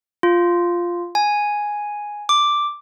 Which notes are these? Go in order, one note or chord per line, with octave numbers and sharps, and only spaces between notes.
F4
G#5
D6